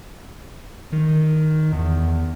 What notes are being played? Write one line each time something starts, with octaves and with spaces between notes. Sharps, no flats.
D#3
E2